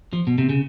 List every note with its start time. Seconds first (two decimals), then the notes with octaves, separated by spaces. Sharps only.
0.13 F3
0.27 B2
0.38 C3
0.49 C#3